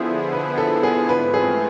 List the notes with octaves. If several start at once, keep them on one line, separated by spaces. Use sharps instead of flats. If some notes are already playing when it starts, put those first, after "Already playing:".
Already playing: D3 F3 B3 E4 G#4 C5
B4
A4
G#4
G#2 E3 A3 C4 F4 B4
G#4